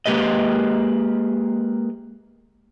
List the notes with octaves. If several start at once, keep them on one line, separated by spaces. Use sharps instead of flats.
G#3 A#3 G4 B4 D#5